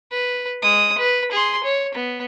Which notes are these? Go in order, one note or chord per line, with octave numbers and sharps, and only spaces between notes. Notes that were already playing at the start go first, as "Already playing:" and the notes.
B4
G#3 D#6
B4
G#4 C6
C#5
B3